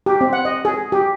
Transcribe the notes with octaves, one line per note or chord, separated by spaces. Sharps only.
G4
C4
F#5
D#5
G#4
G4